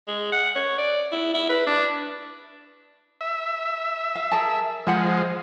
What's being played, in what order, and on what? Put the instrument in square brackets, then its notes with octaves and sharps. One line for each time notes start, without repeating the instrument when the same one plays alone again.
[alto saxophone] G#3
F#5
C#5
D5
E4
E4
B4
D4
[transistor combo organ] E5
[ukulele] F5
G#4 A#4 A5
[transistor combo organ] F3 G#3 [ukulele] C5 F#5 B5